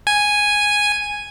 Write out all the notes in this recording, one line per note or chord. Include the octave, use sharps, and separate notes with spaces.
G#5